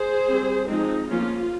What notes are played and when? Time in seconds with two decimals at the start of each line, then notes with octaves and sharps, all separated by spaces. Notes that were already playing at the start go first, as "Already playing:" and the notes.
Already playing: G#4 C5
0.28 G3 C4
0.68 F3 G#3 C4 D#4
1.09 F3 A#3 C#4 F4